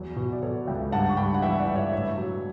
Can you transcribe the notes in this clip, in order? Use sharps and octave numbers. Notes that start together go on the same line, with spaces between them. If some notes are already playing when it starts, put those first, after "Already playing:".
Already playing: E2 F#3 D5
B2
D5
B2 A4 C#5
C#2 E5 G5
G2 F#5 A5
C#6
G2 G5 B5
F#5
E3 E5 G5
D5 F#5
G2
C#5 E5
A2 C#5 E5
F#3